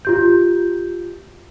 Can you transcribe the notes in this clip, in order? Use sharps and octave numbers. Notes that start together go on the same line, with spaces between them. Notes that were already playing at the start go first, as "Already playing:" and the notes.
F4 G4 G6